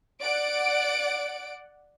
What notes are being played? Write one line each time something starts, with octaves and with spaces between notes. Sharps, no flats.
D5 F#5 D7